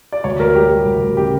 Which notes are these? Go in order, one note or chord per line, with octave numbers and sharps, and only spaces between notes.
D5
D2 C#5
D2 A#4
D2 G4
G3
D2
D2
C#3 G4